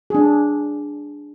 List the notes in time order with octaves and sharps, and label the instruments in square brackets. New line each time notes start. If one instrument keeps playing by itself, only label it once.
[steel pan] D4 G#4